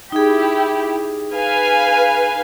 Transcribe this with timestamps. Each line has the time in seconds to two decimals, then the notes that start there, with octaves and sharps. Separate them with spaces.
0.12 D#4 E4 G4 G#4
1.32 B4 F5 G#5